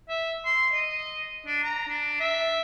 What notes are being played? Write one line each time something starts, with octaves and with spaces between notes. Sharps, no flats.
E5
C6
D#5
D4
A#5
D4
E5